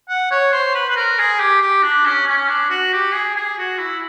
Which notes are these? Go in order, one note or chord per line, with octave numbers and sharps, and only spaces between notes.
F#5
C#5
C5
B4
B4
A#4
G#4
G4
G4
D4
C#4
C#4
D4
F#4
G4
G#4
G#4
F#4
E4